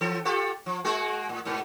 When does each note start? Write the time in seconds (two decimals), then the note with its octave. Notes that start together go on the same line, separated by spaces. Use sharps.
0.01 E3 A4
0.25 F4 G4 A4
0.66 F3
0.84 G#3 A#3 F#4
1.29 A2
1.45 G#2 B2 A#4